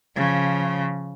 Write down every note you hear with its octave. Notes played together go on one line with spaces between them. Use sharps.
C#3 F3